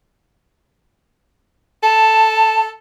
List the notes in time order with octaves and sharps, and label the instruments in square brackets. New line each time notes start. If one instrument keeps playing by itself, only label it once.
[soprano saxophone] A4 [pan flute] A5